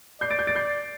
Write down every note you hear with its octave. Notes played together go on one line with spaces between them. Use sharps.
D5 G6 C7
A6 D7
G6 C7
A6 D7
G6 C7